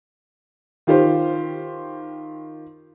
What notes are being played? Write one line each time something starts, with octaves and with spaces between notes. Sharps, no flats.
D#3 F4 G4 C5